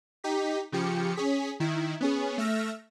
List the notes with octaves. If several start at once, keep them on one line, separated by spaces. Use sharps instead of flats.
D#4 G4 B6
C#3 F3 G4 C#7
C#4 G#4 B6
D#3 E4
B3 C#4 G#4
A3 E5 E6 F6 A#6